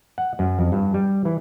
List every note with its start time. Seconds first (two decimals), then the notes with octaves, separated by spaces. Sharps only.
0.18 F#5
0.39 F#2
0.59 F2
0.72 G2
0.94 G3
1.25 E3